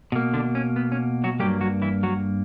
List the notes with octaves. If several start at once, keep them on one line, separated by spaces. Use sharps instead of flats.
B2 A#3
D3 D4
C#4
B3
C#4
F#3 F#4
G2 F#3 G3 A#3 G4
F#3 F#4
E3 E4
F#3 F#4